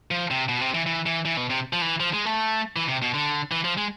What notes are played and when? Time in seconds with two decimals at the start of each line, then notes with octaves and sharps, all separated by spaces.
0.11 F3
0.31 C3
0.49 B2
0.61 C3
0.74 E3
0.86 E3
1.06 E3
1.25 E3
1.37 B2
1.50 C3
1.73 F3
1.81 E3
2.00 F3
2.13 G#3
2.25 A3
2.76 E3
2.88 C3
3.02 B2
3.14 D3
3.52 E3
3.64 F3
3.77 G#3